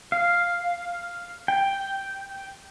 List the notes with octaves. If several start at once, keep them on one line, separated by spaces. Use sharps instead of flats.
F5
G5